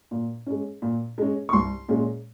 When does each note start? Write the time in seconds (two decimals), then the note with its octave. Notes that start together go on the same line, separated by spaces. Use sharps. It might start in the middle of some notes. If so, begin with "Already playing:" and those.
0.11 A#2
0.46 G#3 C#4
0.82 A#2
1.18 G#3 C#4
1.49 C#6
1.53 C2 C6
1.88 A#2 G#3 C#4